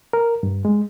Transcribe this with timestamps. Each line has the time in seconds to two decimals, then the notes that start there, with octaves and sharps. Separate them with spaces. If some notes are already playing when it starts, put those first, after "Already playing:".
0.13 A#4
0.43 G2
0.65 G#3